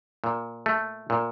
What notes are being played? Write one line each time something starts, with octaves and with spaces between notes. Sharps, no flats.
A#2
A3
A#2